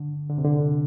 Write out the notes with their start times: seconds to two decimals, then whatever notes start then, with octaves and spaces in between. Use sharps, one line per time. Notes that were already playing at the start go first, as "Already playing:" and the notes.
Already playing: D3
0.30 D3
0.38 C3
0.45 D3